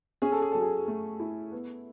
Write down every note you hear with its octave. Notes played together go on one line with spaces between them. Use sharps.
C#4 G#4
A4
G#4
F#3 A4
G#4
A3
E4
B3